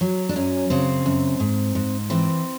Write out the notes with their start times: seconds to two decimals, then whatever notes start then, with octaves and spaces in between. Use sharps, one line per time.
0.01 F#3
0.29 D4
0.36 F#2 C#4
0.70 C#3 C4
1.06 F#2
1.40 G#2
1.75 G#2
2.10 E3 C4